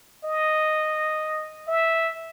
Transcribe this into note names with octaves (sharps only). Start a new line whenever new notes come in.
D#5
E5